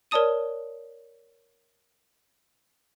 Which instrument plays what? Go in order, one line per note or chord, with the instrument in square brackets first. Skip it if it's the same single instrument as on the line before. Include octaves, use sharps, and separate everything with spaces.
[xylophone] A#4 C#5 D5 A5 D#6 D#7